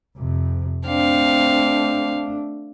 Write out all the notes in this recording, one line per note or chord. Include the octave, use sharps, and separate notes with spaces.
F2 C3
A3 C4 D4 F5